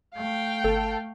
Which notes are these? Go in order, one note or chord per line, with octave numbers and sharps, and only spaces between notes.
A3 F5 G5
G1 A4 A5